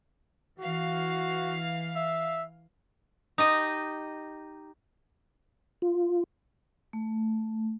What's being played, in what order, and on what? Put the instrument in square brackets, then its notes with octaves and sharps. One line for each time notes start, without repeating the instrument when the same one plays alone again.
[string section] E3 F5 [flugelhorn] F#4
[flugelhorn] E5
[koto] D#4 G4 D#5
[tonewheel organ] F4
[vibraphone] A3